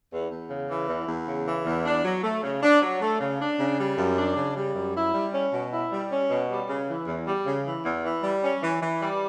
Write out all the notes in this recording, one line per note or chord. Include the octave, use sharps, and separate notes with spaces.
E2
E2
C#3
E3
E2
E2
C#3
E3
E2
D4
F#3
A3
C#3
D4
F#3
A3
C#3
D4
C#3
G3
F#2
D4
C#3
G3
F#2
E4
G3
C#4
B2
E4
G3
C#4
B2
G3
C#3
E3
E2
G3
C#3
E3
E2
E3
G3
C#4
E3
E3
G3